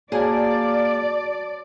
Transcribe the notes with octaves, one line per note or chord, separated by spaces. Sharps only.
A#3 F#4 G#4 C#5 D5 A5